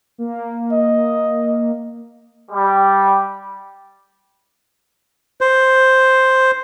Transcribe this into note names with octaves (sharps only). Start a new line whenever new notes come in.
A#3
D#5
G3
C5